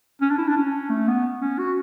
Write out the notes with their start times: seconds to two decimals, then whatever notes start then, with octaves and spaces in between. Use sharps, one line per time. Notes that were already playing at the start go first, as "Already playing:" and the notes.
0.22 C#4
0.31 D4
0.38 E4
0.48 D4
0.57 C#4
0.90 A3
1.08 B3
1.42 C#4
1.59 F#4